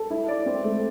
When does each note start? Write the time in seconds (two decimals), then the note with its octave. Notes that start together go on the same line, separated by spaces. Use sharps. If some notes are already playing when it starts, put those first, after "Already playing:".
Already playing: A4
0.10 E4
0.28 D5
0.46 C4
0.64 A3